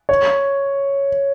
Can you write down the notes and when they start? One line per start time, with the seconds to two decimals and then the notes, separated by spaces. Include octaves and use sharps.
0.09 C#5